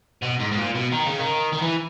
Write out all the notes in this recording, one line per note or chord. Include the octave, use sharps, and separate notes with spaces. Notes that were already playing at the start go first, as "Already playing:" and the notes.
B2
G#2
G#2
A#2
B2
D#3
C#3
D#3
D#3
E3